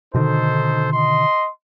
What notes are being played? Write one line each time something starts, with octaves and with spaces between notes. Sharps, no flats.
B2 D3 D#3 D#4 A4 C5
D#5 C6